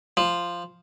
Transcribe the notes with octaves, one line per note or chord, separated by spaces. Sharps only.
F3